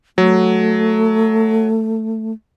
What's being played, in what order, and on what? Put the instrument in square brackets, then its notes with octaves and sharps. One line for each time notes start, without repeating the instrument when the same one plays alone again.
[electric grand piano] F#3 [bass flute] A3